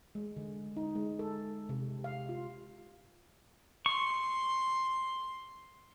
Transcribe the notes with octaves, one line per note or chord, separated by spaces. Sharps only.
G#3
D3
D#4
G#3
A4
C3
F5
F4
C6 C#6